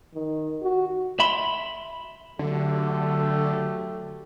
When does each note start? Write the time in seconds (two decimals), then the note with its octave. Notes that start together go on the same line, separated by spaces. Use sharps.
0.14 D#3
0.62 F#4
1.20 E5 B5 C6
2.39 D3 F#3 A3 G4